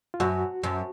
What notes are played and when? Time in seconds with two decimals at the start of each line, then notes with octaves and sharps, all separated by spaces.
0.14 F4
0.20 F#2 F#4
0.63 F#2